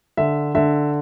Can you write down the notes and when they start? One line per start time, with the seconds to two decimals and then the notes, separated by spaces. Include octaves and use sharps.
0.17 D3 E5
0.55 D3 E5